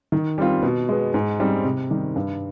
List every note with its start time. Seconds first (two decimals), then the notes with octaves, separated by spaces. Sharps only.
0.12 D#3
0.38 G3 C4 F4
0.63 B2
0.89 G#3 B3
1.14 G#2
1.40 G3 C4 D#4
1.64 C3
1.90 D#3 G3
2.16 G2